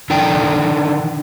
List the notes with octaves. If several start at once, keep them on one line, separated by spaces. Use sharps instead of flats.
D3 D#3 D4 G5